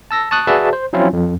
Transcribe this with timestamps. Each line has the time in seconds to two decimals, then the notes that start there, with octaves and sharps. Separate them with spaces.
0.11 A5 E6 A#6
0.31 A5 C#6 D#6 F#6
0.47 F#4 G#4 B4 D5 E5 A5
0.73 C5
0.93 F3 F#3 C4 C#4 E4 F4
1.13 F2